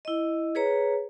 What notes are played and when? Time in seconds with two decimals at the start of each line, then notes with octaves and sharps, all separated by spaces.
0.05 E4 D#5
0.55 G#4 B4 C#5 A#5